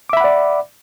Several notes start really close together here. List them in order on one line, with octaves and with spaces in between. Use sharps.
D6 E5 B5 F#5 D5